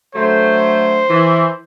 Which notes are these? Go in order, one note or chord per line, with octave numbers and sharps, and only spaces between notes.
D3 F#3 A3 C5
E3